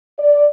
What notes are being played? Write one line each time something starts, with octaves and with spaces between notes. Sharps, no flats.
D5